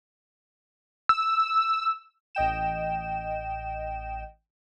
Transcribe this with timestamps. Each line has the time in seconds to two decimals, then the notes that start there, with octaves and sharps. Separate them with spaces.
1.09 E6
2.35 A1 D#5 G5 E7